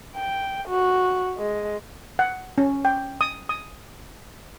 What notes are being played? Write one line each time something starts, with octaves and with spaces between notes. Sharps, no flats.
G5
F#4
G#3
F#5
C#4
G5
D#6
D#6